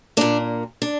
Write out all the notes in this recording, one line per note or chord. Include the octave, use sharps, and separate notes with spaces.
A#2 A#3 D4
D4